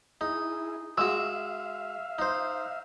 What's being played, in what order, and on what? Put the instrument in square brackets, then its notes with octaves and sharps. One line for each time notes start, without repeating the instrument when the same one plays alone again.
[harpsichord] D#4 [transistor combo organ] E4 G#4
[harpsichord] G#3 F#4 [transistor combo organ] E5 F5 [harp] E6
[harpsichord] D#4 C5